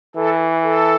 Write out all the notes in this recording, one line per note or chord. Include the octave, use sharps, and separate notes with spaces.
E3 A4
A4